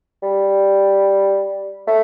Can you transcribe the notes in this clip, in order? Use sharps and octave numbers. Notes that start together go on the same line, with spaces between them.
G3
A3